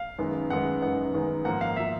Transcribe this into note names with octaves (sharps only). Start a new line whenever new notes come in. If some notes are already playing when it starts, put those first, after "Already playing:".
Already playing: F5
F#2 D#3 G#3 B3
F#2 D#3 G#3 B3 F#5
F#2 D#3 G#3 B3 F#5
F#2 D#3 G#3 B3
G#2 F3 A#3 F#5
F5
F3 A#3 E5